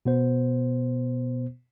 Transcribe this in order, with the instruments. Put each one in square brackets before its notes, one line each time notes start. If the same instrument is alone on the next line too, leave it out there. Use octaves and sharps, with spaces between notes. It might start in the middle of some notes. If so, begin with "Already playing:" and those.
[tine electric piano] B2 B3 C5